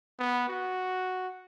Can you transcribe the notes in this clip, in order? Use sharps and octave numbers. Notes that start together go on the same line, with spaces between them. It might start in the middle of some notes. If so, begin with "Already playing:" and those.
B3
F#4